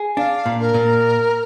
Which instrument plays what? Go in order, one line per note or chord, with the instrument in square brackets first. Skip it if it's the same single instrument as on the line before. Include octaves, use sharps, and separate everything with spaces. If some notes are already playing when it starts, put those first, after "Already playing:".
Already playing: [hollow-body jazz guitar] G#4
[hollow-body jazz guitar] D4 [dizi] F5
[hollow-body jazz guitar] A#2
[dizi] A#4
[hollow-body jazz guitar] A#2